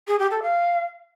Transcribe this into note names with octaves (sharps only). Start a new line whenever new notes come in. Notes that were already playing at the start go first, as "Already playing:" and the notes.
G#4
G4
A4
F5